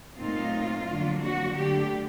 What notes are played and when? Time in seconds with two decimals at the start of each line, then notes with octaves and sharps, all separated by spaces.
0.17 A#2 F#3 A3 C4 D#4 F4
0.85 F2 D3 F#3 A#3 D4
1.18 F#4
1.53 D3 F#3 A3 D4 G4